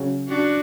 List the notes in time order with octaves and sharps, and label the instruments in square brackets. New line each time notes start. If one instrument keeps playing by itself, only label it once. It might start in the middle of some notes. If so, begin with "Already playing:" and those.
Already playing: [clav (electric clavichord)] C#3 F#3 C#4
[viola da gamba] D4 F#4